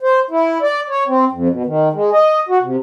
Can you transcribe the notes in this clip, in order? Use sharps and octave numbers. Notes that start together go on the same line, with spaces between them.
C5
E4
D5
C#5
C4
F2
B2
D#3
G#3
D#5
F#4
C3